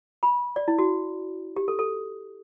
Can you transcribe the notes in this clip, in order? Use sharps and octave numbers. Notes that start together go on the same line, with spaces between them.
B5
D5
E4
F#4
G4
A4
A4